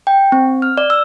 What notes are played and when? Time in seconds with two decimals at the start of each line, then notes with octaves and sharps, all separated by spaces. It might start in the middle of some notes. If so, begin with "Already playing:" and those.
0.07 G5
0.32 C4
0.62 F6
0.77 D5
0.90 E6